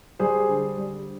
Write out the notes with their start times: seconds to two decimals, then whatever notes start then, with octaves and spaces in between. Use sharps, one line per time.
0.19 G3 G#4 C5
0.49 D3
0.78 G3